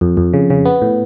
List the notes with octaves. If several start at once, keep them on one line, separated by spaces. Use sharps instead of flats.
F2
F2
C#3
C#3
B3
A2